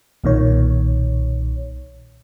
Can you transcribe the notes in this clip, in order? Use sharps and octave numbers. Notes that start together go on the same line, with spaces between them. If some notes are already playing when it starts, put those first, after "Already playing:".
B1 A#2 D#3 C#5